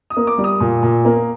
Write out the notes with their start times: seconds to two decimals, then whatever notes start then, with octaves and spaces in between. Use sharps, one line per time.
0.10 D#6
0.17 A#3
0.27 D6
0.38 G3
0.44 D#6
0.60 A#2
0.83 A#2
1.05 A#3